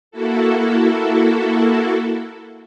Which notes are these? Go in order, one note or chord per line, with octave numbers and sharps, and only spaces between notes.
A#3 E4 F#4 A4